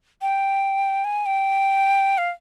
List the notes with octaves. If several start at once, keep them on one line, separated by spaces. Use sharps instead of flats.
G5
G#5
G5
F5